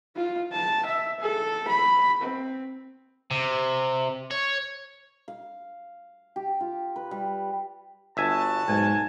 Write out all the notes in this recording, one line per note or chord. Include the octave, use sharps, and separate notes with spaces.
F4
A5
E5
A4
B5
C4
C3
C#5
F5
G4
F4
B4
G3
G1 F#4 E5 G#5 A5
B1 G#2 G#5